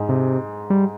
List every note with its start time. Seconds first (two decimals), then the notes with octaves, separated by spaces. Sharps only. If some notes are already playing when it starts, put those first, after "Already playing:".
Already playing: G#2 G#3
0.09 C3
0.70 G3